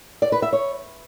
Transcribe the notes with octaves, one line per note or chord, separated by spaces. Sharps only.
D5
B4
E5
C#5